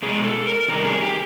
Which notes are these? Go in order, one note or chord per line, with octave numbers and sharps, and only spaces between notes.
B2 G#3 G#4
A4
A#4
C3 D#3 G3 A#4
G#4
G4